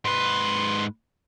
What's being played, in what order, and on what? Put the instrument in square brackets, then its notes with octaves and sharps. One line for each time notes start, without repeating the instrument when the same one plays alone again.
[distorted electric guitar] G#2 B4 [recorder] C6